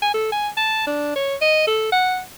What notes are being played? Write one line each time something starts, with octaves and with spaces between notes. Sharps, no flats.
G#5
A4
G#5
A5
D4
C#5
D#5
A4
F#5